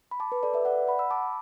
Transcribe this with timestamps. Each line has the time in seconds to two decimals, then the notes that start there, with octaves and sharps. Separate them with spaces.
0.11 B5
0.20 A5 D6
0.32 B4
0.43 A4 D5
0.54 B4 E5
0.65 D5 F#5
0.87 F#5 B5
0.99 B5 E6
1.11 A5 D6